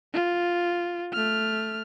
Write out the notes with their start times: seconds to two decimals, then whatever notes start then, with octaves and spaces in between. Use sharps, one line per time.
0.13 F4
1.13 A3 F6